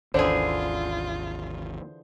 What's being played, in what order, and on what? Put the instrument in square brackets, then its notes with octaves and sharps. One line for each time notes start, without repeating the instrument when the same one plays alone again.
[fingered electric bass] G#1 D#2 C#4 [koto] D3 E3 G#4 [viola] F4 [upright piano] C5